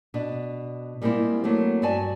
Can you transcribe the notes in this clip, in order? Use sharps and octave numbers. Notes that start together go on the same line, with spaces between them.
B2 D4
G3 G#3 A#3 C4 E4 F4
F#3 A3 A#3 C4
G2 C4 F#4 D5 G#5 A5